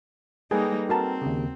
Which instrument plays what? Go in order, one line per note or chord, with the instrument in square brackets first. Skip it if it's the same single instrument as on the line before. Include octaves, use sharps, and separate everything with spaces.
[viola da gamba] G3 A#3 D#4 [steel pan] G#4 [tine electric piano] A4 B4 G5
[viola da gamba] C4 [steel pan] F#4 A#4 A5
[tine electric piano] D#2 C#3